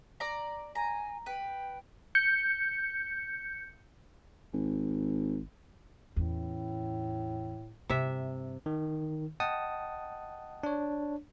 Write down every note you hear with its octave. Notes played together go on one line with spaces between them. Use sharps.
D5 A#5
G#5 A#5
B4 G5
G6 C#7
G#1
E2 A2 C#4
G2 C3 E5
D#3
D#5 F#5 G5 A5 D#6
D4 C#5